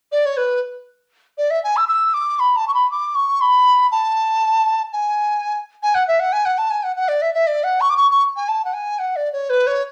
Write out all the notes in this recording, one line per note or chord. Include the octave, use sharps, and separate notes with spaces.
D5
C#5
B4
D5
E5
G#5
E6
E6
D6
B5
A5
C#6
B5
D6
C#6
B5
A5
G#5
G#5
F#5
E5
F#5
G#5
F#5
A5
G#5
F#5
F#5
D5
E5
E5
D5
F#5
C#6
D6
C#6
C#6
G#5
A5
F#5
G#5
F#5
D5
C#5
B4
C#5